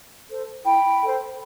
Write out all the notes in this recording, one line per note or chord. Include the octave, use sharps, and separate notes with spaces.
A4 C5
E4 G5 B5
A4 C5